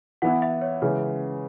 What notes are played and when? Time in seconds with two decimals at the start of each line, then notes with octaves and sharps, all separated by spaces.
0.22 E3 B3 E4 F#5
0.42 E5
0.61 C#5
0.82 C#3 E3 G#3 C#4 B4